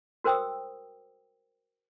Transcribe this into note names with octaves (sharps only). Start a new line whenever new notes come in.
F#4 A#4 C5 G5 D#6 E6